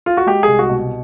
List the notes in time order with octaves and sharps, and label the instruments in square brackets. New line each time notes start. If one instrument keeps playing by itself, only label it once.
[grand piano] F4
F#4
G#3 G4
C2 G#4
F#4
B2